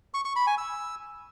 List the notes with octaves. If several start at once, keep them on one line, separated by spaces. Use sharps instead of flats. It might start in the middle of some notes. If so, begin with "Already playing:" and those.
C#6
C#6
B5
G#5
E6